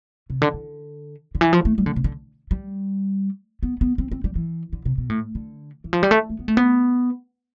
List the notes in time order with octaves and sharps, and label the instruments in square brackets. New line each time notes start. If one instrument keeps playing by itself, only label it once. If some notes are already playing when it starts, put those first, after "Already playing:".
[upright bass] C3
D3
D3
D3
E3
F3
A3
G3
D3
C3
D3
G3
B3
B3
C4
C4
G3
E3
D3
C3
B2
A2
D3
E3
F3
G3
A3
A3
B3
A3
B3